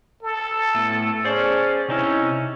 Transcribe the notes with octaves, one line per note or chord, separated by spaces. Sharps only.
A4
A2 A3 B3
C#4 G#4 C5 D5
C3 C#4 D#4 E4